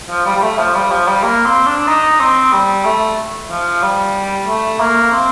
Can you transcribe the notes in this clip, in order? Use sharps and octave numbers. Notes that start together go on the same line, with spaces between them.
F3
G3
G3
A3
F3
G3
F3
G3
A#3
C4
D4
D#4
C4
G3
A3
F3
G3
A3
A#3
C4